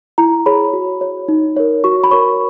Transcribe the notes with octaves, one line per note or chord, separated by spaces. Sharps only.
E4 A#5
G#4 C#5 B5
F#4
C#5
D#4
A#4 C#5
F#4 C#6
B5
A#4 C#5 C#6